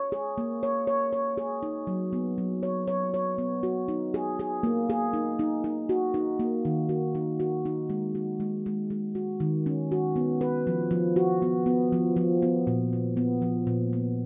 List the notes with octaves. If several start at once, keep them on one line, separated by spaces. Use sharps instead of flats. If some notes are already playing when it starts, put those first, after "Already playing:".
Already playing: C#5
G#4
A#3
C#5
C#5
C#5
G#4
D#4
F#3
B3
F#3
C#5
C#5
C#5
B3
F#4
D#4
G#4
G#4
A#3
G#4
D#4
D#4
D#4
F#4
D#4
A#3
D#3
F#4
D#4
F#4
D#4
G#3
F#4
G#3
G#3
G#3
F#4
D#3
C#4
F#4
B3
B4
F3
F3
F#4
B3
B3
F3
F3
B3
A#2
A#2
B3
F3
A#2
B3